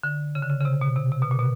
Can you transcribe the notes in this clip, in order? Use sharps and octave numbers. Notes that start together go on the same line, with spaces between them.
D3
C#3
D3
C#3
C#3
C3
B2
C3
C3
B2
A#2
B2